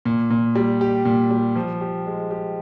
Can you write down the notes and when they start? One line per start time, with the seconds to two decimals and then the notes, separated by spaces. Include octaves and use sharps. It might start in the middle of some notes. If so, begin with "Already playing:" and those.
0.05 A#2
0.31 A#2
0.55 G3
0.81 G4
1.05 A#2
1.31 G3
1.55 F3
1.81 G4
2.06 G#3
2.31 G4